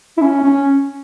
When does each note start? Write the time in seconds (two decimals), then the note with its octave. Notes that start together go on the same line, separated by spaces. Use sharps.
0.17 E4
0.22 C#4
0.44 C#4